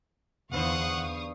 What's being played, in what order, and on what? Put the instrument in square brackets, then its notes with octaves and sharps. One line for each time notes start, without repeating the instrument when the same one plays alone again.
[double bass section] E2 [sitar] G2 D3 C5 [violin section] F5 C#6 D#6 [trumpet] F#5